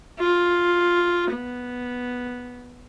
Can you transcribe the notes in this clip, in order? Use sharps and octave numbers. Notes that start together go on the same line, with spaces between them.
F4
B3